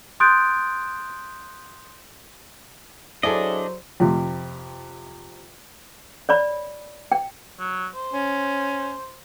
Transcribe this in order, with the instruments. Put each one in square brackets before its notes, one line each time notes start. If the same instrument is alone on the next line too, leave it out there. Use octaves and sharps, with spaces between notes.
[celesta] C6 D#6 F#6 G6 A6 D7
[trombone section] F#3 C5 [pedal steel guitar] D4 D#5 [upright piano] E4 G#4 A4 [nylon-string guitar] D5
[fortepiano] F2 C3
[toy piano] C#5 D5 B5
G5
[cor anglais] F#3
C5
[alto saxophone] C#4